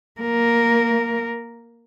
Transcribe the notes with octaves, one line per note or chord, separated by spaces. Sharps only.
A#3 A#4